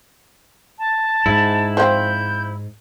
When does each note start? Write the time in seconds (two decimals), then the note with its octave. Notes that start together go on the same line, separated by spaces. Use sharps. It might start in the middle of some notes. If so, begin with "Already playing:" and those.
0.79 A5
1.26 G#2 E4
1.77 F3 C4 G6